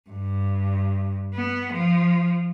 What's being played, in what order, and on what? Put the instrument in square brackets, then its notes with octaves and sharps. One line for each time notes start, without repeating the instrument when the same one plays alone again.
[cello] G2
B3
F3